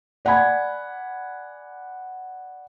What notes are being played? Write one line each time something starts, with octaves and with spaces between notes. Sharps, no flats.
D5 F#5 G#5 B5 G#6